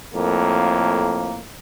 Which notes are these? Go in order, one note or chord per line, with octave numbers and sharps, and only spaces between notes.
F2 A2 A#3